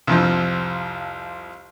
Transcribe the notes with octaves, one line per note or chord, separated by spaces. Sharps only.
C2 F2 F3